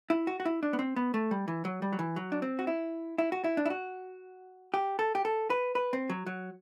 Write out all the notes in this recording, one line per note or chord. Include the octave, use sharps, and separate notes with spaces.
E4
F#4
F#4
E4
D4
B3
C4
B3
A3
G3
E3
F#3
G3
F#3
E3
F#3
D4
C4
F#4
E4
E4
F#4
E4
D4
E4
F#4
G4
A4
G4
A4
B4
B4
C4
F#3
F#3